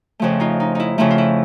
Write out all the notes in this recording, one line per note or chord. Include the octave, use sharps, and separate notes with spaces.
F2 C#3 F3 A3
D#4 F4
D#4
D#4 E4
F2 C#3 F3 A3 E4
F4
E4